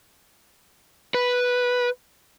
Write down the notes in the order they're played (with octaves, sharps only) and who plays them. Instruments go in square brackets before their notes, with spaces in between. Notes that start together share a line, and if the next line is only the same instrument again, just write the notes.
[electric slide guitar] B4